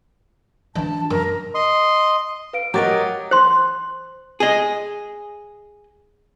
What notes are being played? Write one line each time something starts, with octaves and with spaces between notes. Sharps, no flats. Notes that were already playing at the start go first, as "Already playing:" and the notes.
E3 D4 A5
F#2 A#4
D#5 C6
B4 F5 D7
F#3 G4 A#4 D#5 A#5 D6 A6
C5 C6
G#4 D#5